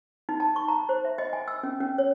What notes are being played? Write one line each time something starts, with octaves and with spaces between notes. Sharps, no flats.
D#4
A5
C#6
A#5
C5
E5
D#5
G#5
E6
C#4
C#4
C#5